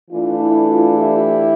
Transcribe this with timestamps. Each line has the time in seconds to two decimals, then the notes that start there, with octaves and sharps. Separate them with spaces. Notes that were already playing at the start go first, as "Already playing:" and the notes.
0.10 E3 A3 D4 F4
0.39 E4
0.69 F4
0.97 E4 G4